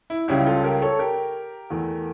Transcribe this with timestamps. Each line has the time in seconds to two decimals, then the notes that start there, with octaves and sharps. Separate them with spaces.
0.10 E4
0.28 C#2 C#3 G3 C#4 E4 G4
0.46 F4 A4
0.63 G4 A#4
0.82 A4 C#5
0.99 G4 A#4
1.70 E2 E3 A3